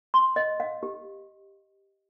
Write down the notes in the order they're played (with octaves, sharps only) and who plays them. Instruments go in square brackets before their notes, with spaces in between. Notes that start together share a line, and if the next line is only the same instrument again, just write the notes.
[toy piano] C6
D#5
F5
G4